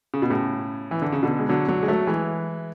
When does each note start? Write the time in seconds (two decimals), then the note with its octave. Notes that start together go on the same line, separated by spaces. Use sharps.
0.14 C#3
0.22 B2
0.30 A2 C#3
0.91 E3
1.02 D3
1.12 C#3
1.23 B2 D3
1.39 G#3
1.49 D3 F#3
1.68 D3 F#3
1.83 G#3
1.88 F#3 A3
2.07 E3 G#3